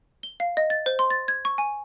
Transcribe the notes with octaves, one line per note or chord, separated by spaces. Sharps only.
G7
F5
D#5
A6
C5
C6
A6
G#6
C#6
G#5